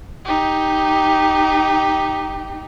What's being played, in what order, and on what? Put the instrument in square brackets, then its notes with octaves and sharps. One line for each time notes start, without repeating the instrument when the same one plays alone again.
[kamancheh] D#4 G4